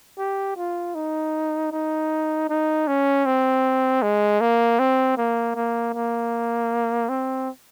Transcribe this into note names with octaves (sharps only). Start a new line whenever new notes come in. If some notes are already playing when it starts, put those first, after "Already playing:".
G4
F4
D#4
D#4
D#4
C#4
C4
G#3
A#3
C4
A#3
A#3
A#3
C4